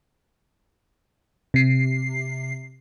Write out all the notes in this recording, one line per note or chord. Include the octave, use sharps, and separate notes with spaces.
C3 C7